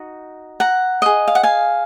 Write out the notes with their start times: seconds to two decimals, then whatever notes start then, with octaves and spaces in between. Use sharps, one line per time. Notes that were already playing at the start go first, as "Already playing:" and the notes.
Already playing: D#4 F#4
0.60 F#5 A#5
1.02 G#4 D#5
1.28 F5
1.35 F#5
1.43 F5 G#5